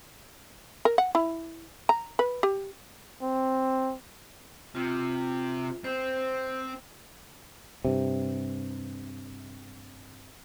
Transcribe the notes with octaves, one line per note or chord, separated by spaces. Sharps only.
A#4
F#5
E4
A#5
B4
G4
C4
C3 F4
C4 C5
G2 C3